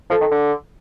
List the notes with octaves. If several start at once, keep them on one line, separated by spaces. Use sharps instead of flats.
F3 A4
D#3
D3